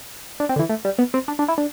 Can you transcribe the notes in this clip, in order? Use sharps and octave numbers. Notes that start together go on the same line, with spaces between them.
D4
C4
D3
E3
A3
G3
B3
C4
D4
D4
E4
D4